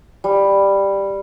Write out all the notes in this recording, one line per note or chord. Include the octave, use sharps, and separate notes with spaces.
G3